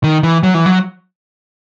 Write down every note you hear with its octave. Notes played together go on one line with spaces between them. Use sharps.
D#3
E3
F#3
E3
F#3